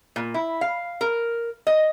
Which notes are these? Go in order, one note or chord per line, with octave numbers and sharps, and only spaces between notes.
A#2
E4
F5
A#4
D#5